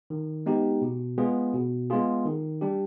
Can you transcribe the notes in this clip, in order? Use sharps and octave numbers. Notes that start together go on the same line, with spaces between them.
D#3
G#3 B3 D#4 G4
B2
G#3 B3 F4 G#4
B2
G#3 B3 F4 G#4
D#3
G3 D4 G4